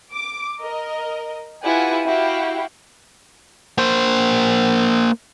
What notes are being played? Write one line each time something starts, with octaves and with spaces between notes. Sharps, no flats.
D6
A#4 D#5
E4 F4 G4 B4 F#5 G#5
E4 F#4 G4 F5 G5
A#3 C5